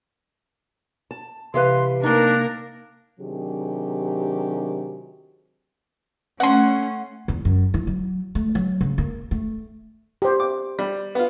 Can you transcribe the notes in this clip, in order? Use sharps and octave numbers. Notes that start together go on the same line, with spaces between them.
A5
C3 E3 G4 B4 F5 C6 F#6
A#3 C4 D4 D#4 A#4
C3 D#3 F#3 D4 G4 G#4
A3 C#4 F#5 C6
E2
F#2
E3
F#3
A3
F#3
C#3
A#3
A3
G4 C5
D6
G3
B3 F4